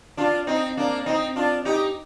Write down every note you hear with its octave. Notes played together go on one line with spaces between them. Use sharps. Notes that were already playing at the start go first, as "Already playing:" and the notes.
D4 F4
C4 D#4
A#3 D4
C4 D#4
D4 F4
D#4 G4